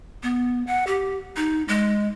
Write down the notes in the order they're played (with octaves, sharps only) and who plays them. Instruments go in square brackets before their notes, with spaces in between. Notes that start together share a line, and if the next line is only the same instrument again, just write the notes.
[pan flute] B3
F#5
G4
D#4
G#3